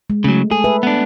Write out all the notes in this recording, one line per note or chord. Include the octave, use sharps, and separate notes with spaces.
G#3
C#3 F#3 A3
G#4 A4
B4 E5
B3 D4